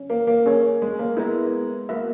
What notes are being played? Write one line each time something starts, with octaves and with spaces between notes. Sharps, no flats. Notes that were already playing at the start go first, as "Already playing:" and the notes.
Already playing: C#4
A#3
A#3
C#4 G#4 C#5
G#3
A#3
G#3 B3 E4 A#4 E5
A#3 B3 F#4 B4 E5